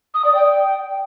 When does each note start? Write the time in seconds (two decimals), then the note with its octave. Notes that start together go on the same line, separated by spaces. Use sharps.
0.14 D#6
0.24 D5
0.35 G5